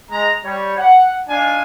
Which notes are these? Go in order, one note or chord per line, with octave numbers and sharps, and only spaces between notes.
G#3 A#5
G3 C#5
F#5
D4 D#4 F4 G#5